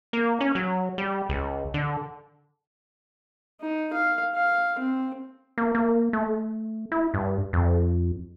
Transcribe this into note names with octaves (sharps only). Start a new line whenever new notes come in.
A#3
C#4
F#3
G3
C#2
D3
D#4
F5
F5
C4
A#3
A#3
A3
E4
G2
F2